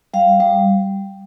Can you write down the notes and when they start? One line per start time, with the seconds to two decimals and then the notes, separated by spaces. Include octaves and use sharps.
0.14 G3 F5
0.40 G3